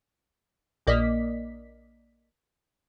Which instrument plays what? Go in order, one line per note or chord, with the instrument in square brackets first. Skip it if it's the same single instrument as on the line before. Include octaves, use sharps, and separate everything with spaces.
[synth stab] A#1 A#3 D5 D#5 B6